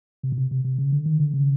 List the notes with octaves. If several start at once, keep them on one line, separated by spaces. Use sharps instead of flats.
C3
B2
C3
C3
C3
C#3
D3
D#3
D3
C#3